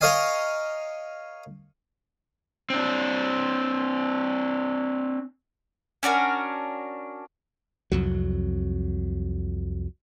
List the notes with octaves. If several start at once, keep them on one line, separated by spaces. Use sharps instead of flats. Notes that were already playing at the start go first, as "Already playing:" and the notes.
A#4 C#5 D#5 F5 G#5
C4 D4
C#4 D4 F#4 A#4
C2 F2 F#3